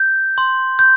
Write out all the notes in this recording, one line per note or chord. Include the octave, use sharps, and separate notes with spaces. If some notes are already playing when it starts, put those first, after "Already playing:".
Already playing: G6
C6
G6